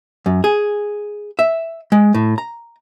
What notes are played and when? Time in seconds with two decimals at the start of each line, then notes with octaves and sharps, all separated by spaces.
0.26 F#2
0.44 G#4
1.39 E5
1.92 G#3
2.14 A2
2.38 A#5